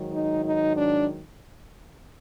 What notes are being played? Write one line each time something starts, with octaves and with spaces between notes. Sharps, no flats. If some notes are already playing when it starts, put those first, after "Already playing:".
Already playing: G#2 D#3 F#3
D#4
D#4
D4